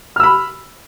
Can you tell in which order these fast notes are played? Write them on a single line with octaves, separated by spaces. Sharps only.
F6 E6 B5